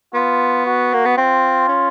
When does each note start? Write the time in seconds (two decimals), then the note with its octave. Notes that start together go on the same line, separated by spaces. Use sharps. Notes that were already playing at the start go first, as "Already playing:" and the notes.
0.14 B3 F4
0.66 F#4
0.93 A#3
1.05 B3
1.17 C4 F4
1.68 C#4